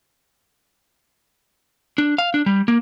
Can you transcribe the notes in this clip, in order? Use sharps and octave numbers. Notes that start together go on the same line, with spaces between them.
D4
F5
D4
G3
A#3